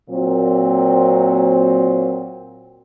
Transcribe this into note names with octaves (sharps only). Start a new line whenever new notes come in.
A#2 F#3 C4